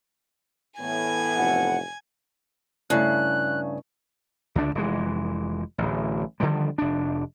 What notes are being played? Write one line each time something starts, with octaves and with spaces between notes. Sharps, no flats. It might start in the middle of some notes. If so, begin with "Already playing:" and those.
A2 E3 B3 G#5 G#6
F1 F#5
G2 C#3 A3 E4 F#6
C#2 D3 D4
F1 E3 G#3
D1 A1
D3 D#3 F3 G3
F1 D4